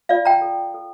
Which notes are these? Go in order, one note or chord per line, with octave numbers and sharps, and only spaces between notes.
F4 D5 F5
G5 A#5
A4
A4